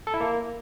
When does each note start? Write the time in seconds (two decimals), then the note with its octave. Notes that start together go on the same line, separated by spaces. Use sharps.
0.07 A4
0.14 E4
0.21 A#3